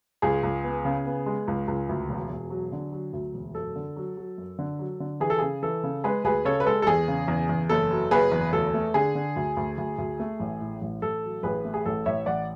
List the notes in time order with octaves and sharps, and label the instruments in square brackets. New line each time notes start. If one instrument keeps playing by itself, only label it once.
[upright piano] C#2 G#4
C#2
B3
C#3
B3
G#3
C#2
C#2
D2
E1
E1
F#3
D3
F#3
D2
E1
F#2 A4
D3
F#3
F#3
F#2
D3
F#3
D3
E3 G#4
A4
C#3 G#4
E3 A4
C#3
G#3 G#4 B4
D2 G#4 B4
C#3 A4 C#5
B4
G#3 A4
A4
E2 G#4
C#3
E2
E2
F#1 A4
F#3
F#1 G#4 B4
E2
D2 A4
A3
D3 G#4
D3
D2
D2
D2
D2
A3
A1
A2
A1
A1 A4
F#3
A1 G#4 B4
A3
G#4
A1 A4
A1 C#5 E5
A1 D5 F#5